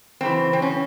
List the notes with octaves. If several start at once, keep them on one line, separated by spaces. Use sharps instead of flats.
F#2 C#3 E3 C4
C4
C#4